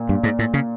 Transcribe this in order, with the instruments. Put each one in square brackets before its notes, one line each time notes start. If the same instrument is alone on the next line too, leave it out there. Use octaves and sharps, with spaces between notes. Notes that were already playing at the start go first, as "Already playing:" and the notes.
Already playing: [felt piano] A#2
[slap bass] G2
G#2
A2
C#3